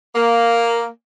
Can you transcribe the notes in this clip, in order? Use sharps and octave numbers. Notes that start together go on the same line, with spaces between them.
A#3